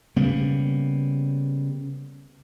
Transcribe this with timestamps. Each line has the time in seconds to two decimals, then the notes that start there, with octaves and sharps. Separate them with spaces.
0.16 C#3 G3 A#3 B3